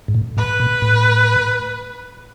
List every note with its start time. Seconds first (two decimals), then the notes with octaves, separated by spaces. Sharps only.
0.08 G#2
0.14 A2
0.37 A2 B4
0.60 A#2
0.82 A2